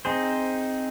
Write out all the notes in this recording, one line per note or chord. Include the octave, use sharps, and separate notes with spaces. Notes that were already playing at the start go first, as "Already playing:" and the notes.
C4 D#4 G#4 C5